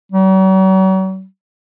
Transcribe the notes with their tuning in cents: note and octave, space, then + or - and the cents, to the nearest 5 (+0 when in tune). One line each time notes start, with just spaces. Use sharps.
F#3 +45